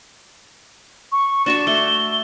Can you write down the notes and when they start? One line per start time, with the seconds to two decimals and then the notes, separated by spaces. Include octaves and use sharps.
1.12 C#6
1.46 D4 F#4 C#6 E7
1.67 A3 G7